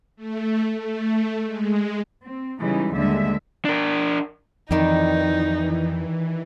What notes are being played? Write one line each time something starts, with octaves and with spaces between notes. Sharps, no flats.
A3
A3
G#3
C4
C#3 E3 G3 G#3 D#4
D#2 D3 G3 G#3 E5
D4 A#4
F2 D#3 E3 G3 D#4